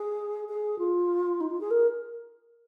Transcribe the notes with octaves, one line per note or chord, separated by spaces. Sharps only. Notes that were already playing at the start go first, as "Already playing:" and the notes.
Already playing: G#4
G#4
F4
D#4
F4
G#4
A#4